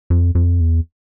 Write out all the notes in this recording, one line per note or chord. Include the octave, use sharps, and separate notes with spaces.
F2
F2
E2